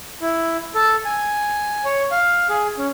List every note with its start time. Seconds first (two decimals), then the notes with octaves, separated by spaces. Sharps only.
0.21 E4
0.75 A4
1.05 G#5
1.85 C#5
2.11 F5
2.49 G#4
2.78 C#4